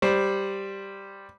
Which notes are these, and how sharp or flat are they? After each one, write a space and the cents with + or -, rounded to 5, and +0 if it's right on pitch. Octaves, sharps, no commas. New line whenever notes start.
G3 +0 C5 +0